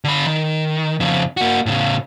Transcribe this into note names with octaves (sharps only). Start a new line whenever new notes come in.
D3 B5
D#3
F2 C#3
A#3 F#4
A2 C#3